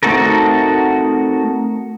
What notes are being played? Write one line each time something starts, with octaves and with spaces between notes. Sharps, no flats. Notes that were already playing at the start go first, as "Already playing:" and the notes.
A3 C4 D#4 F#4 A4 A#4